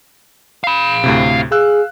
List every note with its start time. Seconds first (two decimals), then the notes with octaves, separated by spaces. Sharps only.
0.64 F5 B5
1.04 D2 A2 C3
1.52 G#4 F5 E6 F#6